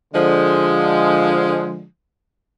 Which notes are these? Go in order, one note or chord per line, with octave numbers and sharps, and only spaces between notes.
D3 F3 G#3